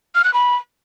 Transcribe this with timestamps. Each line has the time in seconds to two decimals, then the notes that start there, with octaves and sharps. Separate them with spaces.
0.15 F6
0.24 F#6
0.34 B5